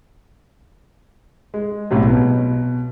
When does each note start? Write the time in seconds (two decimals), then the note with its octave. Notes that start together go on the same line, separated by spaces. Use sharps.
1.54 G#3
1.91 B1 A2 C3 F#3
2.06 B2